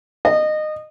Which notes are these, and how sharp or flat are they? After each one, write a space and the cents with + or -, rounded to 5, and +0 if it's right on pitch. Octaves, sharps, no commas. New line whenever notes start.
D#5 -20